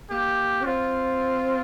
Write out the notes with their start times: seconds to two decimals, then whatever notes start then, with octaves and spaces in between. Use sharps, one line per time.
0.10 A#3 G4
0.61 C#4
0.65 C4 F4